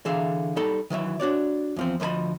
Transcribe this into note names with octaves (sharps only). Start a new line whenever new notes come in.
D3 E3 G#4 E5 F5
G3 D#4 A4 B5
D#3 E3 F#3 E5
D4 F#4 C#5 D5
E2 F3 C4
D2 F3 B4 D#5 B5